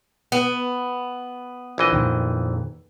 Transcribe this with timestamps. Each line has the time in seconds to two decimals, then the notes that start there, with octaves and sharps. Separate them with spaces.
0.32 B3
1.78 A#1 E3 D#5
1.93 F2 A#2 D#3